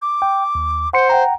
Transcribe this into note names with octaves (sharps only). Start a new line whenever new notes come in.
D6
G5
D#2
C5 F#5 C6 C#7
F#5 G5 A#5